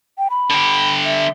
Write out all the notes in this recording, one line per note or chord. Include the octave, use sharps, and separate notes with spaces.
G5
B5
D3 G4
E5